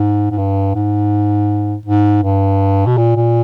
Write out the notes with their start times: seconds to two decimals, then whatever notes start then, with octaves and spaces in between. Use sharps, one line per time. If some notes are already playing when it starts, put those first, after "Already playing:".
Already playing: G#2
0.31 G#2
0.38 G2
0.75 G#2
1.86 G#2
2.23 G2
2.86 B2
2.97 A#2
3.16 A#2